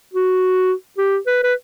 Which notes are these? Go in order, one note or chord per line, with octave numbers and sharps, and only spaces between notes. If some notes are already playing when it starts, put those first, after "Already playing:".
F#4
G4
B4
B4